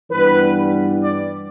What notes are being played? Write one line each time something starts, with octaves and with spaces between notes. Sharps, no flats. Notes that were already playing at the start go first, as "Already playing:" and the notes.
G2 E3 G3 B3 B4
D5